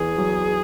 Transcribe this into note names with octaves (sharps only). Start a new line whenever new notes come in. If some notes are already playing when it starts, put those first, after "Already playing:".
Already playing: E2 G#4
F#3